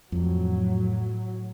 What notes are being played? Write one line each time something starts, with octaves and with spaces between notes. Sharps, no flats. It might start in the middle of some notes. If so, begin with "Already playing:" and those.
F2 A2 F#3